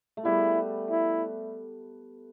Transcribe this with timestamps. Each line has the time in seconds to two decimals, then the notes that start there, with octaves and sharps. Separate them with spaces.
0.17 A3
0.25 G3 B3 E4
0.90 E4